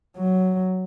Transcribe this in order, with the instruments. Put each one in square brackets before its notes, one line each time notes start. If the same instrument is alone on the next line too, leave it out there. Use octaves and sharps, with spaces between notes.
[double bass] F#3